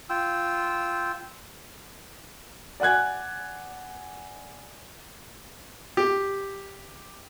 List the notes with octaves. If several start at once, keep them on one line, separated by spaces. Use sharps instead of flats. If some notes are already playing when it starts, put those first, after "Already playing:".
F4 G5 E6
D5 F#5 G#5 F#6 G#6
G4